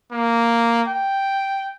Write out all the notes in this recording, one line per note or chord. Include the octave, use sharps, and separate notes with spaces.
A#3
G5